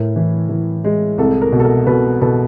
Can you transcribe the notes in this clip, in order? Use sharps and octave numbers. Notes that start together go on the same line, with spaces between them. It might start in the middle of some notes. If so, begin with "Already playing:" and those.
Already playing: A2 A#4
E3
E3
G#3
C2 A4
A#4
B2
A4
A#4
B2 A4 B4
B2 A4 B4